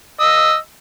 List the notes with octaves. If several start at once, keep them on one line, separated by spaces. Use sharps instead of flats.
D#5 E6